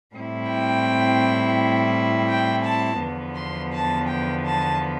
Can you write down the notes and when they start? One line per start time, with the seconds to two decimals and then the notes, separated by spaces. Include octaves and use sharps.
0.15 A2 G3 C4 E4
0.50 G5
2.30 G5
2.65 A5
3.02 E2 D3 F3 B3
3.37 C6
3.73 A5
4.09 G5
4.45 A5